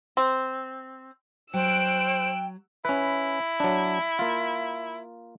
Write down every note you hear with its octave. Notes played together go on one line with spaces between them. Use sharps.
C4
F#3 C5 G5 E6 F#6 D7
C#4 E4 B4
F#3 D4
A#3 F4